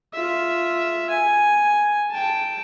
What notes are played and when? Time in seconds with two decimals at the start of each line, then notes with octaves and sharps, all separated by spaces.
0.13 F4 E5
1.10 G#5
2.11 G5 A5